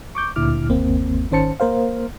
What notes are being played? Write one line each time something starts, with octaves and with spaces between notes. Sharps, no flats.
C#6 D6 G6
D2 A#2 D3 E4 D6 F6
G1 D#2 A#3 C4
G#1 D#3 C#4 C5 A5 C#7
A#3 A#4 C5 F5